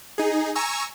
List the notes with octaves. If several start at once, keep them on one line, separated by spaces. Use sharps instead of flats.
D#4 G#4
G#5 A#5 C#6 E6